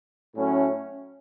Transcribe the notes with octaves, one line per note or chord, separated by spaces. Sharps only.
A2 F#3 A3 C#4